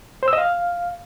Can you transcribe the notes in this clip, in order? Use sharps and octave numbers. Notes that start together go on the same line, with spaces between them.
C5
E6
D#5
F5